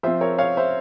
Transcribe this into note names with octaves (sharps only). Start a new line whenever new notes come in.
F3 C4 C5 E5
A#4 C#5
C#5 F5
C5 E5